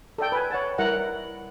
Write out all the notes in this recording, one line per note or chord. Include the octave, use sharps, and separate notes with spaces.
A4 D5 G5
B4 G#5
C#5 F#5 A5
G3 E4 A#4 F#5 A#5